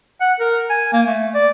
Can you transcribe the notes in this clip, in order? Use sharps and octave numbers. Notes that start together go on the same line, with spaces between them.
F#5
A#4
G#5
A#3
A3
D5